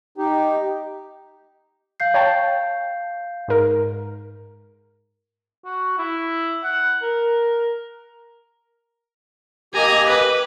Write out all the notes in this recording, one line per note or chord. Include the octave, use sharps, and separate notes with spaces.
D#4 G4
F5 G6 C7
C#5 G5 A5
G#2 A#4
F#4
E4
F#5
A#4
A#3 G4 D#5 G#5 A#5
B4